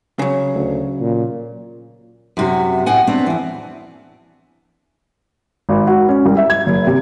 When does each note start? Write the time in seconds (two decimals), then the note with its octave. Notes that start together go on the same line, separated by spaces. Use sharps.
0.19 C#3 F#3
0.55 D2
1.01 A#2
2.37 F#2 C3 F#4
2.86 A2 C4 F#5 G#5
3.07 B3 C4 D4 C#5
3.26 F2 E3
5.69 G#1
5.87 F#4
6.08 C#4
6.25 C2
6.37 E5
6.50 G#6
6.66 F#1
6.87 C3